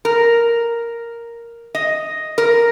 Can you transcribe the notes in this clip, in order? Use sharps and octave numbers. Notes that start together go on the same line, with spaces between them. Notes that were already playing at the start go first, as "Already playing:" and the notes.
A#4
D#5
A#4